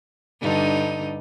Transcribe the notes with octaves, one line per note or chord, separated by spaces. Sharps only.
G2 D3 D#4